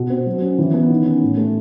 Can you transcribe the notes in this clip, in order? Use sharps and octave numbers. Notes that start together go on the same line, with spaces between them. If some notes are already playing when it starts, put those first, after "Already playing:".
Already playing: B2
C4
F#3
C#4
E3
B3
D#3
C#4
A2
A3